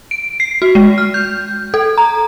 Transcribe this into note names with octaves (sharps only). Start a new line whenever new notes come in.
D7
C7
F#4
G#3
F6
G6
A4
A#5